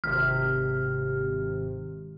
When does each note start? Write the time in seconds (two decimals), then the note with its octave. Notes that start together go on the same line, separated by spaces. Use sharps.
0.04 G#1 C3 F6